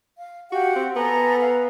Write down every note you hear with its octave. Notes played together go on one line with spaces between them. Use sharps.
F5
F#4 G4 F5 F#5
C4
B3 A4 G#5 A#5
B4 F5 G#5